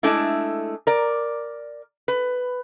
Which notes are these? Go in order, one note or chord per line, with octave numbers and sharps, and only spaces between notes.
G#3 A3 D4 E4
A#4 D5
B4